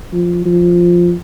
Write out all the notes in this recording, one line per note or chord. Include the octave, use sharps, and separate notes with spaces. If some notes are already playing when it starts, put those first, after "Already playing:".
F3
F3